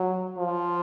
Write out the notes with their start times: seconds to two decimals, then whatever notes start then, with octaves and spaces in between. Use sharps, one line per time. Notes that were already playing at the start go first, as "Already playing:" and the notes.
Already playing: F#3
0.38 F3